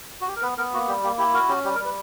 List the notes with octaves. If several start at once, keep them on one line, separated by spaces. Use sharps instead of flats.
F#4
G4
A#4
B3 B4
B3 A#4
A#3 F#4
G3 G4
A#3 G4
E4 G4
F#4 A#4
C#4 G4
G3 G4
A#4
G3
B4